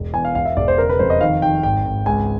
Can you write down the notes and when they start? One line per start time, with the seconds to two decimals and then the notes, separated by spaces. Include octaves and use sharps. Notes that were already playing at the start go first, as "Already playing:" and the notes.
Already playing: E1
0.13 E2 G#5
0.25 F5
0.35 E1 F5
0.45 E5
0.57 E1 D5
0.68 C5
0.78 C#3 A#4
0.89 B4
0.99 F2 C5
1.10 D#5
1.21 D#3 F5
1.42 D#3 G5
1.63 G#1 G5
1.85 G#1
2.06 C#2 G#5